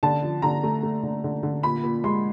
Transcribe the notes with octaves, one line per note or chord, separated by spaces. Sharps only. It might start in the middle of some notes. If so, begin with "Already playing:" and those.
D3 A5
F3
D3 A#5
A3
A3
D3
D3
D3
A#2 B5
A#2
G#3 C6